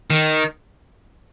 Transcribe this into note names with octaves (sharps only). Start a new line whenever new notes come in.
D#3